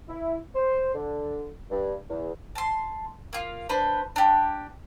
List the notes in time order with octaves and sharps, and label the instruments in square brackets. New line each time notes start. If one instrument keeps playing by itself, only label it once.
[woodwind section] E4
C5
D3
G2
E2
[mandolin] A5 C6
A#3 F4
D4 B4 C5
D4 G4